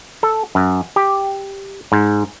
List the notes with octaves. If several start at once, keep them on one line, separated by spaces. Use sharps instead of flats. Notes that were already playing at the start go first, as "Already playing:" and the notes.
A4
F#2
G4
G#2